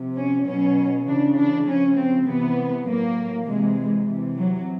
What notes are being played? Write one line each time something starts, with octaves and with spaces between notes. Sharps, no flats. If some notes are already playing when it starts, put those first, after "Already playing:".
Already playing: C3 F3
C#4
B2 F#3 C#4
C#3 E3 D4
D4
C#3 F3 C#4
C4
C3 E3 B3
A2 F#3 A#3
C3 E3 G#3
C3 E3
F#3